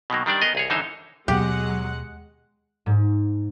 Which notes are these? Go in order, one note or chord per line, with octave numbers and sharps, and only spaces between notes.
B2 D#3 F#3 A#3
D#3 G3 D4 D5
B3 G#4 A#4 D#5
C2 G#4 C#5
F#2 D3 E3 D#4 C5 C#5
D#2 B2 F#3 G#3 B3 G4 F#5
G#2